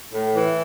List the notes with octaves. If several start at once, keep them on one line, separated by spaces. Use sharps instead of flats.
A2
E3